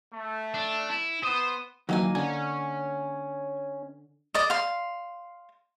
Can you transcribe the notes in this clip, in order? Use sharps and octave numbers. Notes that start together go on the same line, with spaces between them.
A3
D4
E4
B3 C5 D#6
D#3 E3 F#3 A#3 D#4 G#5
D3 C#4 G#5
D5 D#5
F5 C6